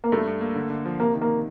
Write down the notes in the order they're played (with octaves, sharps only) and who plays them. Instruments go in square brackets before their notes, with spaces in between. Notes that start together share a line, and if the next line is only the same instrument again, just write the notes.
[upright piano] A#3
[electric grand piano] G2 [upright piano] A3
[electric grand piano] G2
A#3
D3
D3
F3
[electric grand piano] C3 [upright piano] A#3
[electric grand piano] D#3
[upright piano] A#3